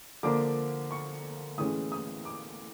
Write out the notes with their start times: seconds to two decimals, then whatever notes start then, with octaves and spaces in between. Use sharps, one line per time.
0.23 D3 F3 A#3 D4 D6
0.91 C#6
1.58 A2 E3 G#3 C#4 D#6
1.92 D#6
2.25 D6